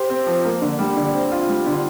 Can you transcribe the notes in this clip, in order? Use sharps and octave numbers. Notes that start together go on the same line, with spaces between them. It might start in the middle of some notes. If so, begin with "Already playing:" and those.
Already playing: G4 C5
C4
F3
A#3
D3
G3
D3
C4
F4
G3
D3